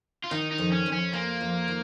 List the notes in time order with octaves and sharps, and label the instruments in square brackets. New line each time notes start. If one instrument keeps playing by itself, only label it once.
[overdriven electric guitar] F4
[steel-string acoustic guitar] D#3 [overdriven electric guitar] D#4
[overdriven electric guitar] D#4
[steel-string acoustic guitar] F2
[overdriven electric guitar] C#4
[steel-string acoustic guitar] F2
[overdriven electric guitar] C#4
[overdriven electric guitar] A#3 [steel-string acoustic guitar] F4
[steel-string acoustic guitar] F2
D#3